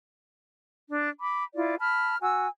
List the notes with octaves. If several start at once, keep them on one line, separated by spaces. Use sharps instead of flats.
D4
B5 D6
E4 F4 D5
A5 B5 F6
F#4 G#5 E6